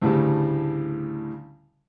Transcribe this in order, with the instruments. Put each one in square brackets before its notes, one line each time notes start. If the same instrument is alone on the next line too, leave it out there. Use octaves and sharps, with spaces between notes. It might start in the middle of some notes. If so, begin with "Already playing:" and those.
[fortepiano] D2 A2 C#3 E3 G3